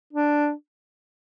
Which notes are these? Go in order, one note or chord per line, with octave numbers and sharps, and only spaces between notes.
D4